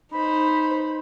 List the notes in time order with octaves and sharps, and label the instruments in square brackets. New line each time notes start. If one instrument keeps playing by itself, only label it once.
[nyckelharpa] D#4 C5 [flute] B5